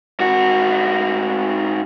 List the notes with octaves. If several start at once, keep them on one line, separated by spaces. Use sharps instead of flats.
G#2 F#4